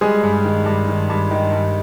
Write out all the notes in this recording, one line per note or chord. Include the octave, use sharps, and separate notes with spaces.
G3 G#3 G#4
G2
D#3
G2
D#3
G2
D#3
G2